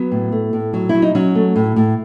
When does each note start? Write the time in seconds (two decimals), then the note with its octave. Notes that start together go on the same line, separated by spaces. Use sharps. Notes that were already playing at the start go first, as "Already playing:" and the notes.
Already playing: F#3 B3
0.11 A2
0.32 A3
0.53 A2
0.73 F#3
0.89 E4
0.94 F#3
1.02 D#4
1.15 F#3 C#4
1.35 A3
1.56 A2
1.76 A2